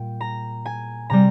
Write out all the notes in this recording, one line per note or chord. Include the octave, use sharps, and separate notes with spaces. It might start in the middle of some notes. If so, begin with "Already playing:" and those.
Already playing: A#2 G3 G5
A#5
G#5
C3 G3 A#5